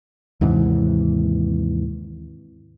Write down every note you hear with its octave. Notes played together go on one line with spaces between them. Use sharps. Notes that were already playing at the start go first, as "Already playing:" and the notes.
D#2 G#2 C3 E3